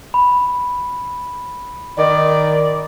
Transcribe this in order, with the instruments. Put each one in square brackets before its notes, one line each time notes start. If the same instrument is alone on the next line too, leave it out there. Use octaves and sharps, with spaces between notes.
[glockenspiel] B5
[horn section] D#3 [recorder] D5